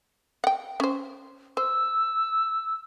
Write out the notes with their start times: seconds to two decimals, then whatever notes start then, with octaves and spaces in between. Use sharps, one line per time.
0.44 F#5 G5
0.80 C#4 C5
1.57 C5 E6